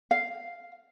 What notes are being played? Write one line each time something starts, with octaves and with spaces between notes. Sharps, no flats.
F5